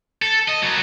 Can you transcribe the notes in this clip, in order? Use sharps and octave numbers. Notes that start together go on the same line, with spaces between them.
A4
D#5
F#3 A#3